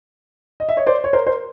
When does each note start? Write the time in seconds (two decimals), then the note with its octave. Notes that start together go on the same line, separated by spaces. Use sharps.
0.60 D#5
0.69 E5
0.77 C#5 D#5
0.86 C5 D5
1.04 C#5
1.13 A#4 C5
1.27 A#4 C5